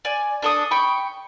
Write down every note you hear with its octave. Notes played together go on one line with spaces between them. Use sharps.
D5 G#5
D4 A4 D#6
G5 B5 C#6